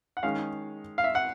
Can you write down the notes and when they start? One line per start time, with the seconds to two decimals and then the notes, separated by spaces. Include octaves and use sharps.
0.17 F#5
0.23 D#3 G#3 C#4 F5
0.98 F5
1.04 E5
1.15 F#5